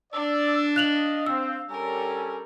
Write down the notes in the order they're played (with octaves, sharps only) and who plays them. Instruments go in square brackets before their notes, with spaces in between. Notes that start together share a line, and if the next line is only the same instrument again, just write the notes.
[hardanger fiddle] D4 [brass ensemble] D5 [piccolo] E6
[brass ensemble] D#5 [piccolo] F5 [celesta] F#6 F7 F#7
[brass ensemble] C4 [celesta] E6
[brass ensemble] G3 C#4 A4 [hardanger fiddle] A#4 [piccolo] G#5